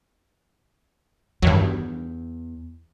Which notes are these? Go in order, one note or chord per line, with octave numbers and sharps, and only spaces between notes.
E2 G2 D#3 F#3